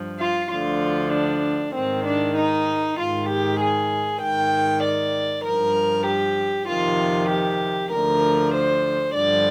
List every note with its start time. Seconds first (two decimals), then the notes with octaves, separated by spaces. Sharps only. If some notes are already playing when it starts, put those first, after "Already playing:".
Already playing: G2 F3
0.19 F4
0.51 D2 D3 F3 F4
1.13 D4
1.74 G#2 D#3 C4
2.05 D4
2.36 D#4
2.97 G#2 D#3 F4
3.28 G4
3.60 G#4
4.20 G#2 D#3 G5
4.83 D5
5.44 G2 F3 A#4
6.06 G4
6.67 F2 C3 D#3 F4
7.29 G4
7.91 D2 D3 F3 A#4
8.54 C5
9.14 G2 D3 F3 D5